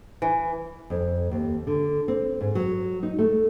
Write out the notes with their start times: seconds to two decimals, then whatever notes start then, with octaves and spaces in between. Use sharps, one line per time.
0.22 E3
0.90 F2
1.31 D#2
1.67 D3
2.08 C4
2.41 G#2
2.55 F#3
3.03 D#4
3.19 A3